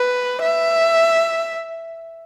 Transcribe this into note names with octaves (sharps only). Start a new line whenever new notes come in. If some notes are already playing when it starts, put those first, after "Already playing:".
Already playing: B4
E5